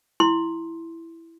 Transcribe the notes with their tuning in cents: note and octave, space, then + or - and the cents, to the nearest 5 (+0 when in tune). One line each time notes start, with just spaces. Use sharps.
E4 +5 C6 +10